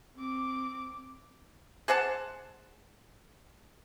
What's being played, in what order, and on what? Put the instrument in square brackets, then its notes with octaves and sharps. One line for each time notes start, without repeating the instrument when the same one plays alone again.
[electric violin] C4 D6
[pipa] G#4 C5 F#5 A5